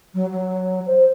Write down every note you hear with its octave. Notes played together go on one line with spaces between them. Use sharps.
F#3
F#3
C5